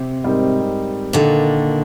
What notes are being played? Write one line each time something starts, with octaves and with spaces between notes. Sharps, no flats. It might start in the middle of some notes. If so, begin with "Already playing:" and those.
Already playing: C3
G#2 G3 C4 D#4 A#4
A#2 D3 D#3